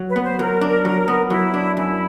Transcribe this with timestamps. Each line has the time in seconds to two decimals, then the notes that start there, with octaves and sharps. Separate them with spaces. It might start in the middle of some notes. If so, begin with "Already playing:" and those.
Already playing: F#3
0.08 B4
0.16 B3
0.24 C5
0.39 F#3 A#4
0.61 D4
0.85 F#3
1.08 B3
1.30 F#3 E4
1.54 D4
1.77 F#2 E4